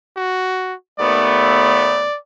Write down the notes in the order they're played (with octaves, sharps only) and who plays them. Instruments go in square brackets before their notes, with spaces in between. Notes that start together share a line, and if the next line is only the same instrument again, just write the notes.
[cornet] F#4
[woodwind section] D#2 A3 B3 [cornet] D5